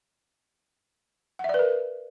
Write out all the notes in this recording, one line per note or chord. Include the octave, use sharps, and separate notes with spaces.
A#4 B4 D5 E5 F#5